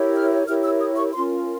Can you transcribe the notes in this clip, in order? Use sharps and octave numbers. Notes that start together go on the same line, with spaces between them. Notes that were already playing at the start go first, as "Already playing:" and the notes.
Already playing: E4 G4 A#4 C#5
F6
E4 G4 A#4 C#5 F6
E6
D#6
C#6
C#4 F4 A#4 C6